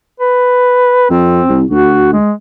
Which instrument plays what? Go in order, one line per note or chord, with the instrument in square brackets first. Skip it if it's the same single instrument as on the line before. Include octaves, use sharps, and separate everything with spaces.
[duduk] B4
[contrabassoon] F2 [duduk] C4
[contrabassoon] C2
[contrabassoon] D2 [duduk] F#4
[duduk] G#3